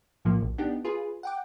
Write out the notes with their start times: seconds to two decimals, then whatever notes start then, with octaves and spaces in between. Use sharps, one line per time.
0.25 B1 A2 F3 A#3
0.42 A#1
0.58 B3 D4 D#4 G4
0.85 F4 G#4 B4
1.23 F#5 G5 D6